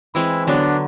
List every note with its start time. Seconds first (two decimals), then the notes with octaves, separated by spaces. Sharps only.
0.15 E3 G#3 C4 E4
0.47 D3 F#3 B3 D4